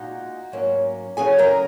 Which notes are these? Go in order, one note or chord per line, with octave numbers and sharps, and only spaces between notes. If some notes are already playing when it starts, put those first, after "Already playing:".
Already playing: A#2 G#3 D#4 F#4 F#5
G#2 F#3 A#3 C#4
C#3 F#3 C#4 G#4 G#5
A#4 A#5